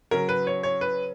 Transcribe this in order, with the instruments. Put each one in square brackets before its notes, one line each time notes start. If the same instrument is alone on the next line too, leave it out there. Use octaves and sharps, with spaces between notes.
[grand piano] C#3 F#3 C#4 A#4
B4
C#5
C#5
B4